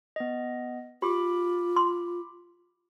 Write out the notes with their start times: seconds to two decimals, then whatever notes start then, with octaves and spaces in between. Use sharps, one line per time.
0.16 B3 D#5
1.02 F4 G4 B5 D6
1.76 C6